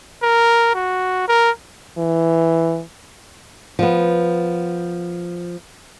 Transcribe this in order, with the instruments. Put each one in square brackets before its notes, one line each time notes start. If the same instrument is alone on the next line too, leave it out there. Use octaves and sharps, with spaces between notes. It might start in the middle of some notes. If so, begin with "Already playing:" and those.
[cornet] A#4
F#4
A#4
[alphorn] E3
[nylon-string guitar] F3 B3